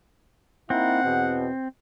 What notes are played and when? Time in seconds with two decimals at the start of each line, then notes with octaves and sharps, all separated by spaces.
0.70 A#3 C4 D#4 E4 F#5
1.04 E2 B2